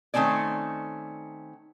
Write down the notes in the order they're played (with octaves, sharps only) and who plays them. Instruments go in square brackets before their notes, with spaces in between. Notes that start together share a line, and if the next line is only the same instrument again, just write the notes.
[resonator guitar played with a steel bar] D#3 A3 C4 C#4 D5